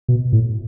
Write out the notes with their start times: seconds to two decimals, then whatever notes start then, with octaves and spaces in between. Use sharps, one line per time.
0.08 B2
0.33 A2